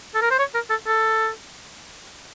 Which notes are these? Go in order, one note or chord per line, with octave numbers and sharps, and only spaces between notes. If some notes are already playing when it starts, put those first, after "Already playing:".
A4
A#4
C5
C#5
A#4
A4
A4